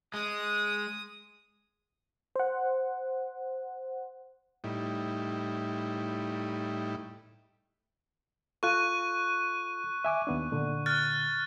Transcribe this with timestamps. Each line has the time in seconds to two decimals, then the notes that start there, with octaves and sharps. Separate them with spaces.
0.14 G#3 D#6
2.36 C5 F#5
4.64 A2 G3 D#4 E4
8.63 F4 A4 C#6 F#6 D#7
10.04 E5 G#5 D6
10.27 D#2 B3 D4
10.52 A#2 D3
10.86 F6 F#6 A6